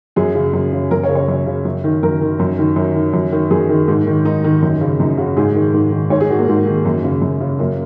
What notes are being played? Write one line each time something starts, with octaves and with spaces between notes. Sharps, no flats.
F#2 G#4
C#3
F#2
C#3
F#2 A#4
C#5
C#3
C#5
F#2
C#3
F#2
D#3
F#2 A#4
D#3
F#2
D#3
F#2
D#3
F#2
D#3
F#2 G#4
D#3
G#2
D#3
G#2 D#4
D#3
F#2
C#3
F#2 D#4
C#3 F#4
G#2 G#4
D#3
G#2
D#3
G#2 C#5
G#4
D#3 F#4
A#3
G#2 G#3
D#3
F#2
C#3
F#2
C#3
F#2 A#3